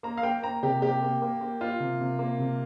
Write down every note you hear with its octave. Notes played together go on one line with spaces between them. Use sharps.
A#3 A#5
F5
A#3 G5
A#3 A#5
C3 G4
A#3 G4
A#3
A#3
A#3
A#3 F4
C3
C3
A#3
C3